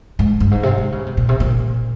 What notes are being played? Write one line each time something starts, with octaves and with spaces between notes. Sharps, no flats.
G#2
G2
G#2
C3
D#3
C#3
C3
A#2
C3
A#2